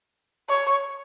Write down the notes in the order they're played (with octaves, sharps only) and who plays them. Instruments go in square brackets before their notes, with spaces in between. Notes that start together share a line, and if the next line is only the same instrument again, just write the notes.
[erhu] C#5